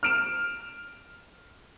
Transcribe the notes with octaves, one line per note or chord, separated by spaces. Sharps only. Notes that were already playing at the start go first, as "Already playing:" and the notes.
F6 D7 E7